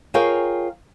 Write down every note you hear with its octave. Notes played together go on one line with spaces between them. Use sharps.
F4 G#4 A#4 C#5 F5 G5